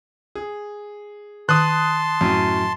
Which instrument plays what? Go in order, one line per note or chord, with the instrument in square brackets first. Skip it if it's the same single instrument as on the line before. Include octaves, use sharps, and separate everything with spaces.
[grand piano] G#4
[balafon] D#3 [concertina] A5 C6 [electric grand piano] D#6 F#6
[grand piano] F#2 A2 F#3